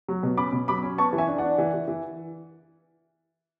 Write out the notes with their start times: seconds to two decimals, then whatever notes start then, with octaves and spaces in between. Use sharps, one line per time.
0.08 F#3
0.23 B2
0.37 C#4 B5 D6
0.52 B2
0.68 F#3 B5 D6
0.83 C#4
0.98 B3 A5 C#6
1.13 E3
1.18 E5 G#5
1.28 D4
1.38 D4 D5 F#5
1.58 E3
1.74 E3
1.88 E3